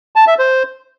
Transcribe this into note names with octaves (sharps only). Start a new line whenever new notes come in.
A5
E5
C5